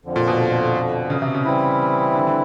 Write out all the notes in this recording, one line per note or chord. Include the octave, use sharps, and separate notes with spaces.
F2 D3 F3
A#2
B2
C#3
C3
C#3
E3 G3 C4 E4
D3
D3